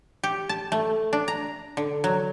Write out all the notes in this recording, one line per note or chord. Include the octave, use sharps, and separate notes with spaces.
G4
A5
A3
D4
A#5
D3
F#3